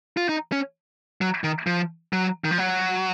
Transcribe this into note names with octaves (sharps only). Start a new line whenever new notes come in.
F4
D#4
C#4
F#3
D#3
F3
F#3
D#3
F3
F#3